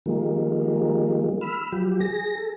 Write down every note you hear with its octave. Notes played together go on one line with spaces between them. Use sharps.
D#3 F3 G3 G#3 A#3
B5 E6 F6
F3 F#3 G4
G#4 A#6
A4